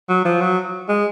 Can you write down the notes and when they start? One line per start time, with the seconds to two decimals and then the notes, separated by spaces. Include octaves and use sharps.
0.09 F#3
0.25 F3
0.41 F#3
0.89 G#3